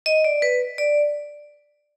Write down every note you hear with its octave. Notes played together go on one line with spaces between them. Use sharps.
D#5
D5
B4
D5